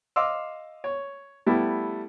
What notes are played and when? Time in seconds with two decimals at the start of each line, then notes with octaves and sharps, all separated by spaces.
0.16 D#5 F5 C6 D6 E6
0.84 C#5
1.47 G3 A3 B3 E4 G4